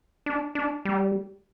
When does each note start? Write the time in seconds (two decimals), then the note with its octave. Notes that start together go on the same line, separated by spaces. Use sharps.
0.26 D4
0.55 D4
0.85 G3